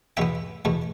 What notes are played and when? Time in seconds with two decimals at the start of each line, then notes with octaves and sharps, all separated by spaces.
0.17 E2 B2 B3 E5 G5
0.65 E2 B2 A3